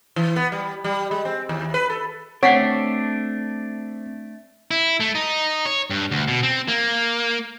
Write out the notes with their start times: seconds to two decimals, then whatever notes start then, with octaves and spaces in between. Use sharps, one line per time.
0.16 E3
0.36 B3
0.52 G3
0.84 G3
1.11 G#3
1.25 C4
1.49 D#2
1.74 B4
1.90 A4
2.43 A3 C4 D4 C#5 F#5 B6 C7
4.71 E4
5.00 A3
5.15 D#4
5.66 C#5
5.90 G2
6.11 D2
6.28 B2
6.43 C4
6.68 A#3